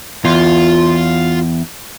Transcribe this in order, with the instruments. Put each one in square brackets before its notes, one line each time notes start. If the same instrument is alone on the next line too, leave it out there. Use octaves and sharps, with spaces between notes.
[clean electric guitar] E2 [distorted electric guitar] F4